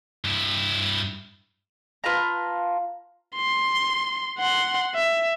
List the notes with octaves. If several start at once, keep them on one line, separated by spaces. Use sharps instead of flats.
G2 E4
F4 B4 A5 A#5
C6
F#5 C6
E5